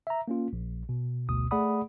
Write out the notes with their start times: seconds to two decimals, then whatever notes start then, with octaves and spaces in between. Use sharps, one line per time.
0.07 E5 A#5
0.28 A#3 C#4 F4
0.53 A#1
0.89 B2
1.29 A1 D2 B2 D#6
1.51 A3 G#4 D5 F#5 B5 D#6